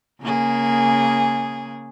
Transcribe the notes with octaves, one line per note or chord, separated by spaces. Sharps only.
C#3 A#3 G#4